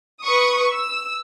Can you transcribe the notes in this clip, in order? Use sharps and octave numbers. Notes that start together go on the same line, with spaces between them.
B4 C#6 D#6
E6